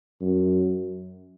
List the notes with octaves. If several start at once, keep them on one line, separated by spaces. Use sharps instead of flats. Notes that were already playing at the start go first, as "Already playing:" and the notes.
F#2